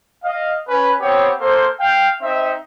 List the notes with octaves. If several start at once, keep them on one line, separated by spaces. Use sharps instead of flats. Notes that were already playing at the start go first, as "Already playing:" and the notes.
D#5 F5
C#4 B4
B3 C4 G4 C#5
A#3 A4 C5
F5 G5
C4 D#4 E5